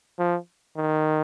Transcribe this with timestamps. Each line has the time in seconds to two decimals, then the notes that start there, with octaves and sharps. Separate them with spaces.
0.19 F3
0.77 D#3